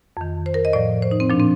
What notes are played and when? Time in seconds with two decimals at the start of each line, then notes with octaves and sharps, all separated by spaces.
0.17 F2 D#3
0.46 C5
0.54 A#4
0.65 D#5
0.73 A2 F3 D5
1.02 C5
1.11 D#4
1.20 C4
1.30 A#2 F3 D4
1.40 C4